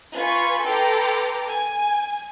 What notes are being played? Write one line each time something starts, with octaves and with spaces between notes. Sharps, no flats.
F4 B4 G#5 B5 C#6
A4 B4 G5 A#5 C6 D6
G#5